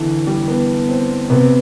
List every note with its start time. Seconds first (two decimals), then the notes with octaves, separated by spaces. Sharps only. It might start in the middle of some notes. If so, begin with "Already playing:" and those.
Already playing: D3 E3
0.27 G3
0.48 B3
0.89 C4
1.30 C3 B3